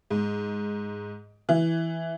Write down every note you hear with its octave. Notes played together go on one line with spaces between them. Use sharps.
G#2
E3